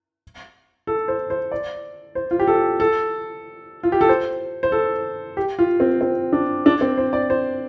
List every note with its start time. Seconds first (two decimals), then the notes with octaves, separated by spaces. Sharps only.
0.87 A4
1.08 C5
1.30 C5
1.52 D5
2.15 C5
2.31 F4
2.39 G4
2.48 A4
2.80 A4
3.83 F4
3.92 G4
4.01 A4
4.09 C5
4.63 C5
4.72 A4
5.37 G4
5.59 F4
5.80 C4
6.01 C4
6.33 D4
6.66 D4
6.81 C4
6.98 C5
7.13 D5
7.30 C5